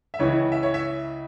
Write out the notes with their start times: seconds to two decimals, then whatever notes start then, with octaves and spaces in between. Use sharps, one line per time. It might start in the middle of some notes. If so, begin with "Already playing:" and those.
0.14 E5
0.19 C#2 C#3 E3 C#5
0.52 E5
0.63 C#5
0.74 E5